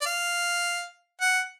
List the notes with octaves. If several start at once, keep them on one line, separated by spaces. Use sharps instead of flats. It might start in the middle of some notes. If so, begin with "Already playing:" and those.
D5
F5
F#5